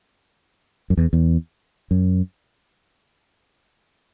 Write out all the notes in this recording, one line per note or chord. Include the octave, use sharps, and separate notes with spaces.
F#2
E2
E2
F#2